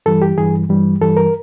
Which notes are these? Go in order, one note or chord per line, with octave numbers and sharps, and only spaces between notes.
G2 E3 G3 A4
G4
G2 E3 G3 G#4
G2 E3 G3
G2 E3 G3 A4
A#4